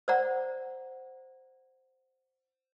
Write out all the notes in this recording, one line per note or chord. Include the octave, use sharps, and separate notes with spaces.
C5 D5 F#5 A#5